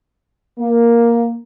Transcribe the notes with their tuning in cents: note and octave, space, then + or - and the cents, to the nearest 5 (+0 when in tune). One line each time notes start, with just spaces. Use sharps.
A#3 +5